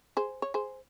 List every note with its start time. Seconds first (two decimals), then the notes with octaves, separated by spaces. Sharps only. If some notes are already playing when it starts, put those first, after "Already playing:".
0.17 G#4 C5
0.42 C#5
0.54 G#4 C5